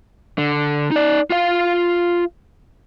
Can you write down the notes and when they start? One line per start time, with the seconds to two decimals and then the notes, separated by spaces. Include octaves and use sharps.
0.38 D3
0.91 D#4 D5
1.30 F4 F5